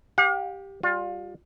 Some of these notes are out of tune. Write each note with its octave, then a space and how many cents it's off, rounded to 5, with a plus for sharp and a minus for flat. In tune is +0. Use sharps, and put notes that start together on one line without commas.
G4 +0 F5 +45
G3 +0 F4 +25